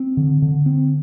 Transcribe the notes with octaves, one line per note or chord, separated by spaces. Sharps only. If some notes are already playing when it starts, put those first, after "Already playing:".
Already playing: C4
D3
D3
C4